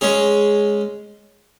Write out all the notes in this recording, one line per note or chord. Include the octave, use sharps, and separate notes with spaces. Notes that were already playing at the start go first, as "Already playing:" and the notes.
G#3 C#4 G#4